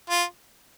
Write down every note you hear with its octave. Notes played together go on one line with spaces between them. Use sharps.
F4